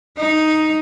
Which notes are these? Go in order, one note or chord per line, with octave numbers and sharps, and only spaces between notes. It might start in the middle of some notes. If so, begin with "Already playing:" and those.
D#4